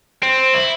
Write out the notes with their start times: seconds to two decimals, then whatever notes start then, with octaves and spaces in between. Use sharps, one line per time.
0.23 C4
0.54 E4